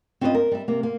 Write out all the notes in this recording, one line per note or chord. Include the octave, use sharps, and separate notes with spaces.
C4 C#4 F4 B4 D5 D#5
A#4
G3 E5
C3 A#3
A#3